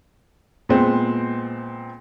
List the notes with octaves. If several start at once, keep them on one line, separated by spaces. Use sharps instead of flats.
A#2 G#3 B3 C4